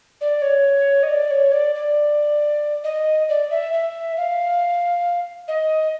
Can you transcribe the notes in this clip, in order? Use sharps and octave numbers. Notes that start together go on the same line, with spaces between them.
D5
C#5
D#5
D5
C#5
D5
D5
D#5
D5
E5
E5
F5
D#5